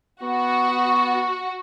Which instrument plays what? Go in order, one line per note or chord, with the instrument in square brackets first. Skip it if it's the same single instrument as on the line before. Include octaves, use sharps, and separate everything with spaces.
[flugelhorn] B3 [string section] F#4